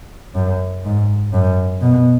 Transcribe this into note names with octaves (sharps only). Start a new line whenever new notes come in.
F#2
G#2
F#2
B2